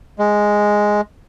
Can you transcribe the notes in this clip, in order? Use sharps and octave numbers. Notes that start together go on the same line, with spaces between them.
G#3